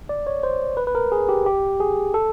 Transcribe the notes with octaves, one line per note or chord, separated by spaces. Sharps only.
D5
C#5
C5
B4
B4
A#4
G#4
G4
G4
G#4
A4